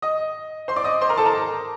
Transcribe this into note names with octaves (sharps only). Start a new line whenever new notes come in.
D#5 D#6
C5 C6
D5 D6
D#5 D#6
C5 C6
A#4 A#5
A4 A5
A#4 A#5